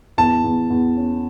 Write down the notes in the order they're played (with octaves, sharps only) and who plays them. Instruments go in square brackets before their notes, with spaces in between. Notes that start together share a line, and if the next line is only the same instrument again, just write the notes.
[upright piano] E2 [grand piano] A5
[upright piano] E2
E2
C#4